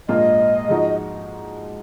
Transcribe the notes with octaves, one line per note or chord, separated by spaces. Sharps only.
A#1 G#2 F3 A#3 F4 D#5
G#2 F3 G#3 D#4 F#4